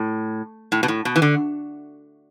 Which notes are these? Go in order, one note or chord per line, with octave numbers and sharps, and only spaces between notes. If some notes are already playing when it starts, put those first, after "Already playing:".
Already playing: A2
A2
B2
A2
B2
E3
D3